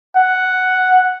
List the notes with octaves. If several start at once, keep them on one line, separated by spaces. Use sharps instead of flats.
F#5